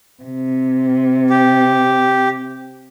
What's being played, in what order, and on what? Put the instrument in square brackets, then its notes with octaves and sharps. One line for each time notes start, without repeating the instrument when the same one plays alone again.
[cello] C3
[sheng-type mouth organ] G4